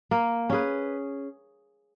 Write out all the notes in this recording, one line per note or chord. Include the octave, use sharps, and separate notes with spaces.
A#3
C#4 G#4 B4